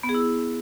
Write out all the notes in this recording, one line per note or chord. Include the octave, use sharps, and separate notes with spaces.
B3
G#4
E4